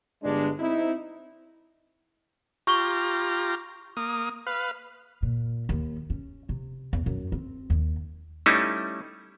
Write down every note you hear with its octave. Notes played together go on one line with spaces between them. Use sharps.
G1 G#3 D4
C4 D#4 E4
F4 G4 A#5 C#6 G7
A#3 D#6
B4 F5
A#2
D#2
C#4
C3
E2
F#2
C4
D#2
G3 A3 C#4 D#4 E4